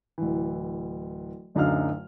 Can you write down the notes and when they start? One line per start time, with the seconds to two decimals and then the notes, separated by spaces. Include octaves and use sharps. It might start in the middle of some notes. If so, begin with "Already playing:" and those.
0.18 D1 E3
1.55 D1 F#2 D3 D#4 F5 F6